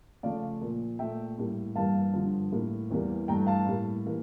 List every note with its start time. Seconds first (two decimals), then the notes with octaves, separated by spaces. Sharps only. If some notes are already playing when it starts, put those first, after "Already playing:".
0.23 C#3 F3 A3 D5 F5
0.61 A#2 F3 A#3
0.99 A#2 A3 E5 G5
1.38 A2 G3 A#3
1.75 G2 E3 G3 A#3 F5 A5
2.14 G2 D3 F3
2.52 A2 G3 A#3
2.91 E2 E3 G3 A#3
3.28 G2 E3 A3 G5 A#5
3.47 F5 A5
3.67 A2 G3 A#3
4.06 E3 A#3